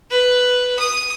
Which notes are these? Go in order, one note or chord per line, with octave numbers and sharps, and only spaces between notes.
B4
D#6